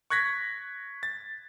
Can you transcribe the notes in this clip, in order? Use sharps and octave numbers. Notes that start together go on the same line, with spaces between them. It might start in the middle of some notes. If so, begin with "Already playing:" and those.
C#6 F#6 G#6 A#6 B6
A6